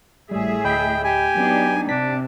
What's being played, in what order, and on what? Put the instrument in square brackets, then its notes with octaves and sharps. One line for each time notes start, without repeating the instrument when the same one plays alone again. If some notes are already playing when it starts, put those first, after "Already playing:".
[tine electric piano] G#1 G3 [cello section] A2 G#4 E5
[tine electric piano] D2 D#5 B5 [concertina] G5
[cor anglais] G4 [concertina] G#5
[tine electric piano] F#3 [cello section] B3 D4 D#4
[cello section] C3 [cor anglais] D4 [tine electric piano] B6